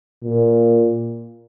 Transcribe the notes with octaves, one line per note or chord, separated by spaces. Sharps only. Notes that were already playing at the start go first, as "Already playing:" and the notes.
A#2